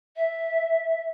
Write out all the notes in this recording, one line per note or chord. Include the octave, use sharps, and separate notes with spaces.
E5